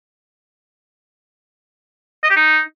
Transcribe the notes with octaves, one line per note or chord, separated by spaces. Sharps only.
D#5
G4
D#4